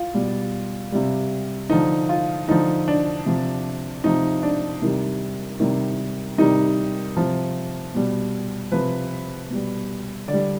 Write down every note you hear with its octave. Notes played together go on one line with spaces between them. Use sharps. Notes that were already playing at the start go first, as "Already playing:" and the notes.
Already playing: F4
B2 G3
C3 G3
D3 F3 D#4
F4
D3 F3 D#4
D4
C3 F3
C3 F3 D#4
D4
C3 D#3 G3
C3 D#3 G3
C3 D#3 G3 D#4
C3 F3
B2 G3
C3 F3 B4
B2 G3
D3 D5
G3